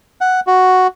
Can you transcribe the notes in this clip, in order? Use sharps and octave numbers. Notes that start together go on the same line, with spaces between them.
F#5
F#4